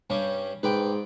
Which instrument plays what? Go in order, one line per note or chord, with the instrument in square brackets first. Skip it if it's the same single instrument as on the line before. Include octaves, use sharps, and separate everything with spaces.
[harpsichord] G2 G3 C#4
[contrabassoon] G#2 [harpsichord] B4 D5 G5